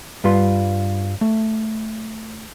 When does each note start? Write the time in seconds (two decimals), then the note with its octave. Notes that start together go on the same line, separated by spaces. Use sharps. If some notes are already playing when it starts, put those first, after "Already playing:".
0.24 G2 G3 F4 B4 C6
1.21 A3